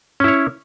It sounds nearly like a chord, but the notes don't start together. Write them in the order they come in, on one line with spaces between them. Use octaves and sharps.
C#4 E4 C#5